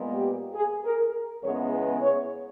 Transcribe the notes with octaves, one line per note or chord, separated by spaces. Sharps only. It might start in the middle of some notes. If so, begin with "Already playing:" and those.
Already playing: A#2 G#3 B3
G4
G#4
A#4
E2 C#3 E3 G#3 B3 C#5
B4
C#5